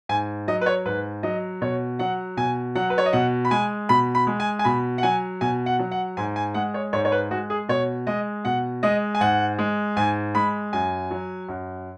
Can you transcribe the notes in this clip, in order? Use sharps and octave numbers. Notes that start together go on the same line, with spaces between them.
G#2 G#5
F#3 D#5
B4
C#5
G#2 B4
F#3 D#5
B2 C#5
F#3 F#5
B2 G#5
F#3 F#5
B4
C#5
D#5
B2 F#5
B5
G#3 G#5
B2 B5
B5
G#3
G#5
G#5
B2 B5
F#5
F#3 G#5
B2 G#5
F#5
F#3
F#5
G#2 G#5
G#5
G#3 F#5
C#5
G#2 C#5
C#5
B4
G#3 F#4
G#4
B2 C#5
G#3 D#5
B2 F#5
G#3 D#5
G#5
G#2 F#5
G#3
G#2 G#5
G#3 B5
F#2 G#5
F#3
F#2